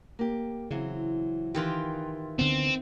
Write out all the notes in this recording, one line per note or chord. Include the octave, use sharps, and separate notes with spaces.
A#3 G4
C#3 E3 F#3 C4
D#3 E3 F4 G4
D2 D3 B3 C4